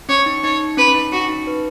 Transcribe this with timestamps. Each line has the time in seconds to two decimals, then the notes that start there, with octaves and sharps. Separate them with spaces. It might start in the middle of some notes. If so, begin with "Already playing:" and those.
0.09 C#4 C#5
0.26 D#4
0.43 D#4 C#5
0.77 C#4 B4
0.88 C#4
0.94 D#4
1.12 C#4 F#4
1.29 D#4
1.47 B4